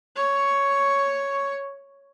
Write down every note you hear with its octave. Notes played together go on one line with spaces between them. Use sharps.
C#5 C#6